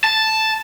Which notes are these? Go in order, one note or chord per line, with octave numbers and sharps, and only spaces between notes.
A5